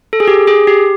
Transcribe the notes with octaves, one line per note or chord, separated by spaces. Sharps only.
A4
G#4
G4
G#4
G4